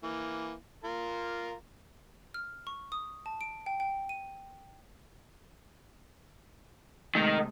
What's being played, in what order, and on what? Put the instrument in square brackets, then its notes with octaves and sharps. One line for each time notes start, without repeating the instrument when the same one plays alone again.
[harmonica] E3 A#3
F4 A#4
[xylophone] F6
C#6
D#6
A5
D7
G5
G5
D#7
[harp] C3 G#3 A3 [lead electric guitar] D#3